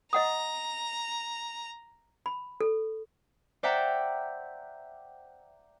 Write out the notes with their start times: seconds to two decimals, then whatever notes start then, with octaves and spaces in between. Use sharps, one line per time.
0.13 D#5 F#5 A#5 D#6
2.26 B5
2.61 A4
3.63 C5 D5 E5 F#5 G5 A#5